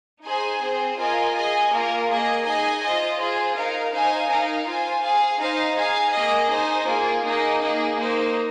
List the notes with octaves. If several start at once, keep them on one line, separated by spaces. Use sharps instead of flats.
D#4 G#4 C5 G#5
C4 G#4 C5
F4 A#4 D#5 G#5
G#4 D#5 G#5
A#3 F4 A#4
A#3 G#4 D#5
D#4 G#4 D#5 G#5
F4 C5 D#5
F4 G#4 C5
D#4 A#4 F5
D#4 C5 F5 G#5
D#4 A#4 F5
F4 C5 G#5
G#4 F5 G#5
D#4 C5 F5
G#4 F5 G#5
A#3 G#4 D#5
D#4 C5 G#5
A#3 F4 G#4
A#3 D#4 G#4 D#5
A#3 D#4 G#4
A#3 D#4 C5